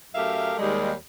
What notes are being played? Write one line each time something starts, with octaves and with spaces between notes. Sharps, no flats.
F#2 A3 G4 A#4 E5 F5
D#2 G3 G#3